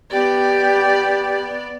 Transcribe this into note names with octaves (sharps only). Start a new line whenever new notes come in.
B3 G4 D5